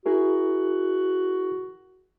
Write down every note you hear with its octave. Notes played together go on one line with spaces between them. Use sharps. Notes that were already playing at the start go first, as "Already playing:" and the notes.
E4 F#4 G#4 A#4